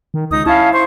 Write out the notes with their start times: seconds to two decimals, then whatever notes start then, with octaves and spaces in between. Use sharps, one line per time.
0.14 D#3
0.31 C#2 D#4 D#6
0.46 C#4 E4 F5 A5
0.73 C5 C#6